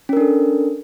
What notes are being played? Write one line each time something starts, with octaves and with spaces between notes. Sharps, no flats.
C#4 D4 A4 A#4